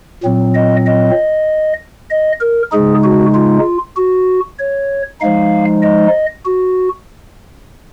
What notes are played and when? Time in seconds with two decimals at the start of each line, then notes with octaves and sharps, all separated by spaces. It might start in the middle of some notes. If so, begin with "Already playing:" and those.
0.24 A#2 F#3 C4
0.55 D#5
0.86 D#5
2.11 D#5
2.41 A#4
2.72 C#3 G#3 D#4 G#4
3.04 F#4
3.34 F4
3.96 F#4
4.59 C#5
5.20 F3 G#3 D#4 F5
5.83 D#5
6.45 F#4